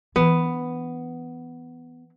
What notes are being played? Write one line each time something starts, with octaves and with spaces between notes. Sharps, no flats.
E3 B3 D4